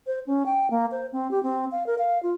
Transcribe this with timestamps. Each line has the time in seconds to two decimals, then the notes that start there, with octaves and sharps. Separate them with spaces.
0.07 C5
0.27 C#4
0.46 G5
0.71 A#3
0.91 C5
1.13 C4
1.31 G4
1.43 C4
1.72 F5
1.87 A#4
1.98 F5
2.23 F4